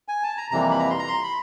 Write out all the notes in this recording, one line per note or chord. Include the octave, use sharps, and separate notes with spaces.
G#5
A5
A#5
F2 C3 E3 G3 A#3 A#5
B5
A#5
C6
A#5
C6
B5